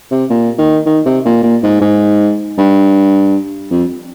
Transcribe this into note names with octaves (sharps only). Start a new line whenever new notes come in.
C3
A#2
D#3
D#3
C3
A#2
A#2
G#2
G#2
G2
F2